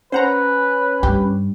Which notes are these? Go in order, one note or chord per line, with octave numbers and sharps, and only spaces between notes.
C#4 B4 C5 F#5 A#5
G2 G4